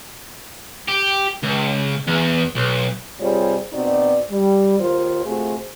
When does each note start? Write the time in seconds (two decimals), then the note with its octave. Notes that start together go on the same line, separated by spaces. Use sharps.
0.88 G4
1.43 C#2
2.08 E2
2.55 B1
3.20 C3 G3 F4 G#4 C5 C#5
3.73 B2 C4 D#4 F#4 D5
4.31 G3
4.79 D#2 F4 C5
5.25 C3 A3 F4 F#4 G#4 C5